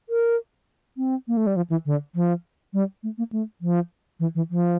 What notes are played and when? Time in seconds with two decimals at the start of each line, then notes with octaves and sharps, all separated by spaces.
0.09 A#4
0.97 C4
1.28 A#3
1.37 A3
1.47 G3
1.56 F3
1.70 E3
1.86 D3
2.15 F3
2.73 G3
3.03 A3
3.18 A#3
3.32 A3
3.61 F3
4.20 E3
4.35 E3
4.50 F3